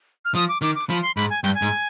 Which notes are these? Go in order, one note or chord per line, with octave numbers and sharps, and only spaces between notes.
F6
F3 D#6
D6
D#3 D6
D6
F3 B5
C6
G#2 B5
G#5
G2 G5
G#5
G#2